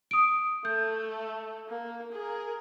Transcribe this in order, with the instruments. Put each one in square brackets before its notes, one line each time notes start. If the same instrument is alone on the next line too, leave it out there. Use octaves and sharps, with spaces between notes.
[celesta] D#6 D7
[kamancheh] A3 [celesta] G6
[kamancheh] A#3
G#4 A#4